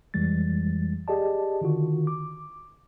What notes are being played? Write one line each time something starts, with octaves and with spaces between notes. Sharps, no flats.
F2 E3 G3 G#3 A6
G4 G#4 D5 D#5 A5
D3 D#3 F4 F#4
D6